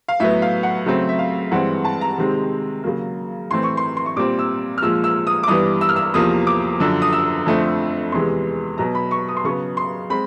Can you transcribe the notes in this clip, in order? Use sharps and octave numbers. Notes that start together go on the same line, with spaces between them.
F5
A2 F#3 B3 E5
F5
F#5
C#3 F#3 A3 C4
E5
F5
G2 E3 G#3 C4 F#5
A5
A#5
C3 D#3 G#3 C4
C#3 F#3 A#3
A2 E3 A3 C4 C6
C#6
C6
C6
C#6
A#2 G3 C4 D6
E6
F6
A#2 F3 G#3 E6
E6
D#6
D6
G2 E3 G3 B3 D#6
E6
F6
E6
E2 C3 F3 A#3 D#6
D6
F#2 D3 F3 E6
D#6
E6
F2 D3 F3 A3 C4
E2 C3 E3 G#3 C6
B2 F#3 B3 A#5
B5
C#6
D#6
C6
C#3 F#3 B3 C#6
C6
G#3 C4 B5